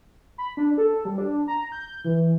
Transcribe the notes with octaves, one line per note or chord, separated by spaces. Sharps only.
B5
D4
A4
G3
D4
A#5
G6
E3